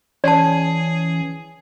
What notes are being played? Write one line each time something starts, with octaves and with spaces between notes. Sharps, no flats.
E3 C#4 G#4 D5 A5